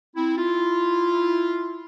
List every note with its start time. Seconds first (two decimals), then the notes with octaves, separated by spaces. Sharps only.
0.15 C4 E4
0.38 E4 F4